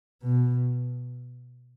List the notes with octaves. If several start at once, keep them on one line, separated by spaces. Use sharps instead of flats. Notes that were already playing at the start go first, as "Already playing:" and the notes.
B2